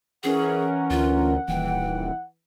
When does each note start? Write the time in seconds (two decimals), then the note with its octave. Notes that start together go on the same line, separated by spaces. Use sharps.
0.24 E3 C#4 G#4 A#4 F#5
0.90 D2 F4
1.48 D#1 E3 G5